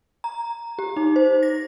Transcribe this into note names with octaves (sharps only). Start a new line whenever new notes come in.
A#5
G4
D#4
C5
A#6